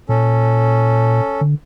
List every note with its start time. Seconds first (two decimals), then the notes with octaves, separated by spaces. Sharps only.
0.09 A#2 C#4 A4
1.41 D3